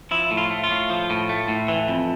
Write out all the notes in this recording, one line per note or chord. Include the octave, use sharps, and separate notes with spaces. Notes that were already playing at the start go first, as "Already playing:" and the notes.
F3 E4
A2
F4
A3
F4
A2
F3
A2
A3
A2
E3
F2